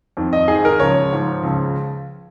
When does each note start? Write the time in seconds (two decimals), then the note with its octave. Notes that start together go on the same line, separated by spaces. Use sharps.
0.17 F2 D#3
0.33 D#5
0.48 G#2 D#3 G#4
0.65 A#4
0.80 C#2 C#3 F3 C#5
1.13 G#2 F3
1.43 C#2 C#3 F3